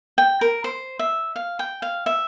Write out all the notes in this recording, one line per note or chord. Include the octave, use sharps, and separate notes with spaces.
G5
A#4
C5
E5
F5
G5
F5
E5